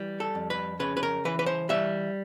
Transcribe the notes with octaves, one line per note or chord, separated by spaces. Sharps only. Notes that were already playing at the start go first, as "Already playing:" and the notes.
Already playing: E3 G3
A4
F2
B4
C#3 B4
B4
A#4
E3 B4
B4
C5
G3 E5